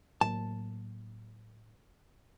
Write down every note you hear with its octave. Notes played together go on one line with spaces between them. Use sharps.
A2 F#3 A#3 A5